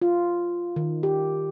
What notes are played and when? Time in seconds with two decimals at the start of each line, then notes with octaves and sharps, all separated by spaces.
0.02 F4
0.76 D#3
1.03 G4